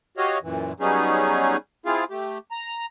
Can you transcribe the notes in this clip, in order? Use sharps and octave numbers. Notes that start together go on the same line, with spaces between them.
F#4 G4 C#5 D#5 F5
F#2 A#2 E3
F#3 G3 B3 C#4 D#4 G#4
C4 E4 F4 G#4 F5
A3 G4
A#5